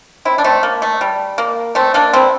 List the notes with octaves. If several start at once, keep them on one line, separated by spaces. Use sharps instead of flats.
C4 E4
D4
A3 C4
A#3
A3
G3
A#3
A3 C4
A#3 D4
C4 E4